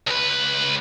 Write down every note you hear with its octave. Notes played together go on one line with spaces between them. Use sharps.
C#2 B4